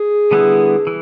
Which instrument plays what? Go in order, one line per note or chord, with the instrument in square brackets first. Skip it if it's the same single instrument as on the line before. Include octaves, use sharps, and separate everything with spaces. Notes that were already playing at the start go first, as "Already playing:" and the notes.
Already playing: [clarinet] G#4
[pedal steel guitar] D3 G3 B3 E4
E3